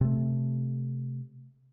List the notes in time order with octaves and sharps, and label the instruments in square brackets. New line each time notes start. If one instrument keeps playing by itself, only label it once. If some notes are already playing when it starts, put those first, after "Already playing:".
[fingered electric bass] C3 A3